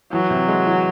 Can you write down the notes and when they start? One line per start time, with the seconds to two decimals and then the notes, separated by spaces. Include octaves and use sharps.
0.12 E3 F#3
0.30 C3
0.48 G#3
0.66 E3